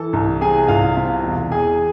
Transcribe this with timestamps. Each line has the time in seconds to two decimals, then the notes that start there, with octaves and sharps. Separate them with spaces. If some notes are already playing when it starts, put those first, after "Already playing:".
Already playing: E3 A4 A5
0.13 C2
0.41 C3 G#4 G#5
0.68 C2 F4 F5
0.97 C3
1.23 E1
1.52 E2 G#4 G#5